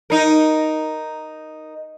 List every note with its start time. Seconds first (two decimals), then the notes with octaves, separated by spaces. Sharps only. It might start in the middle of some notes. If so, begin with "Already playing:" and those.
0.10 D#4 A#4